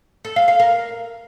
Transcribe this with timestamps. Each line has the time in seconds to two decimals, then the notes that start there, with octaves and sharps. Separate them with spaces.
0.25 A4
0.36 F5
0.48 F5
0.60 A#4